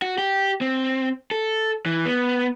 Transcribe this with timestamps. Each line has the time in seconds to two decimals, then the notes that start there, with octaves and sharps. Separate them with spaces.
0.02 F#4
0.18 G4
0.61 C4
1.31 A4
1.86 E3
2.06 B3